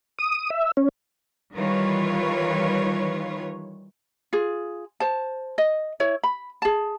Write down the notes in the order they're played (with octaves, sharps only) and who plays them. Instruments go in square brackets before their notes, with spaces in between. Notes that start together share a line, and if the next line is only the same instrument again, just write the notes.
[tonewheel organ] D#6
E5
C#4
[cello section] D#3 E3 G3 F4 B4 C#5
[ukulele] F4 G#4
C5 A5
D#5
E4 C#5
B5
G#4 A5